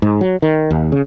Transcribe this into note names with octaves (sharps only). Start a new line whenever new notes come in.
G#2
F#3
D#3
D#2
C#3